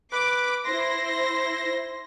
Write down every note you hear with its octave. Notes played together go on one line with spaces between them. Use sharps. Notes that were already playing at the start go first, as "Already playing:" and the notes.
B4 D6
E4 C5 C6 A#6